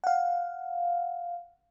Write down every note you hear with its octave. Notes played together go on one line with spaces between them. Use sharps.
F5 F#5